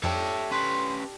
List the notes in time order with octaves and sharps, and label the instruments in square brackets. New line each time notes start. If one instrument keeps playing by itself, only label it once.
[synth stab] F2 [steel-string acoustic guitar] D4 G4 A4 [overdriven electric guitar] C#5 E5
[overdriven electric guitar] C#4 B4 [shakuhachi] C6